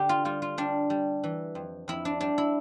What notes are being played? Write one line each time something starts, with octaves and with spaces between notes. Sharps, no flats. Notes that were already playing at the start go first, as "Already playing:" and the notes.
Already playing: D3 G4
F4
G3 F4
F4
G3 D4
G3
E3
F2
F2 E4
D4
G3 D4
E4